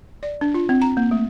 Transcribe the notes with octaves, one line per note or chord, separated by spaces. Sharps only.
D5
D4
F4
C4
A#5
A#3
A3